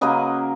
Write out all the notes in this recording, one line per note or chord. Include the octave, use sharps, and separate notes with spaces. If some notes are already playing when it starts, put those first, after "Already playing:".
C#3 F#3 A#3 B4 D#5